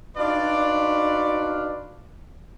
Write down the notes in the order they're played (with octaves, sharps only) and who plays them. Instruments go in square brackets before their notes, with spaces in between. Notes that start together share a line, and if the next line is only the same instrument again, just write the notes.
[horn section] D4 D#4 F4 F#4 B4 D5